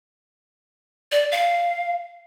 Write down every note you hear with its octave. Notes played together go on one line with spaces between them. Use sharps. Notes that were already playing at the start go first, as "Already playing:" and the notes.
D5
F5